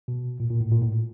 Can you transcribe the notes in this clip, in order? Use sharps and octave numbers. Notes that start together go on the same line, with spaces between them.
B2
A#2
A#2
A2
A#2
A2